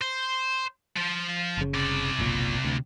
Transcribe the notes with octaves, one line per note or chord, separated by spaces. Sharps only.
C5
F3
F#1 C#3
C3 D5
F#1 B1 A#2
D2